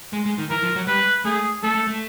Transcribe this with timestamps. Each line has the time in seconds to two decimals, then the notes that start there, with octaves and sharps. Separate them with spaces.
0.13 G#3
0.26 G#3
0.38 D#3
0.50 E3 A#4
0.63 F3
0.76 F#3
0.87 G3 B4
1.25 A3 G#4
1.63 A3 A4
1.75 A3
1.87 A3